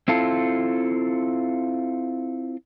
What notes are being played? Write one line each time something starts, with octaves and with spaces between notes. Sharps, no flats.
C4 E4 F4 A4